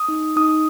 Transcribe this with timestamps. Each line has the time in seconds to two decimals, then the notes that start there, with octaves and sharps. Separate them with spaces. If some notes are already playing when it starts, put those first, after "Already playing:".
Already playing: D#6
0.08 D#4
0.36 D#4 D#6